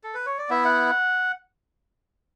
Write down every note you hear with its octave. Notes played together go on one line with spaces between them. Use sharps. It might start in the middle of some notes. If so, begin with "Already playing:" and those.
A4
B4
C#5
D5
B3 E4 E5
F#5